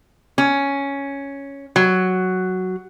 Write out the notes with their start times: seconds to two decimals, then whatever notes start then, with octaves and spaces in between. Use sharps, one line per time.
0.38 C#4
1.76 F#3